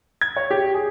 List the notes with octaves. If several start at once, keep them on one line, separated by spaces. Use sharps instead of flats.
G#6
C#5
G4
G#4